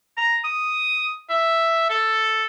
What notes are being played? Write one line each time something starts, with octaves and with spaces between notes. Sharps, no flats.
A#5
D#6
E5
A4